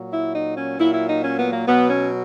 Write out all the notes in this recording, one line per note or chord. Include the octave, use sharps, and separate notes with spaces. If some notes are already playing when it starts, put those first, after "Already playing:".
Already playing: A#2 F#3
E4
D#4
C#4
A#2 F#3 E4
E4
D#4
C#4
B3
A#3
B2 F#3 B3
C#4